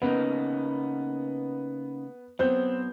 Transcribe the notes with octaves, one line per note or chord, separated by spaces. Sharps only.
C#3 A#3 B3 D#4
F#3 B3 C4 G6